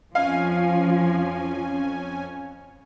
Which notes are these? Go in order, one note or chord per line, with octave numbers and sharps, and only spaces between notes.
F2 F3 C#4 F5 G#5